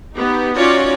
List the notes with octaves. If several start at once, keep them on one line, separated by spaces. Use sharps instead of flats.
B3 D#4 G4
C#4 D#4 F4 F#4 C#5 D5